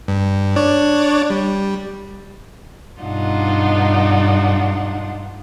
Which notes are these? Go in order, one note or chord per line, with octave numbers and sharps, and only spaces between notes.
G2
D4 C#5 D5
G3
G2 B2 D4 D#4 F4 F#5